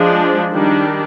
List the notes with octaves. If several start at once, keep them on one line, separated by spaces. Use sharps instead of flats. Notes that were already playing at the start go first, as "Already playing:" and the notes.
Already playing: F3 G#3 D4
D#3 G3 D4